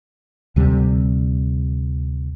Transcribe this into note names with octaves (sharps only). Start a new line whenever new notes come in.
D2 C3 G3